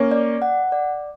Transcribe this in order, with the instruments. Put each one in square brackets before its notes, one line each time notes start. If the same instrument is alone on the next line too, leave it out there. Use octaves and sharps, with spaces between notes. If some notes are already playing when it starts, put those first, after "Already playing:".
Already playing: [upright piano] A#3 C#4
[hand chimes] D5
F#5
D5